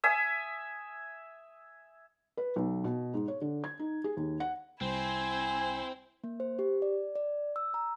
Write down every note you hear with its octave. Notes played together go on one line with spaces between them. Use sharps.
E5 G#5 D#6
B4
B1
B2
G#2
C#5
D3
G#6
D#4
G#4
D#2
F#5
C2 C4 E4 C5 G#5
A#3
C5
G4
D5
D5
E6
A#5